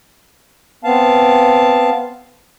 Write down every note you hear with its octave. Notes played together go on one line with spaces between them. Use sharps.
B3 C4 F5 A5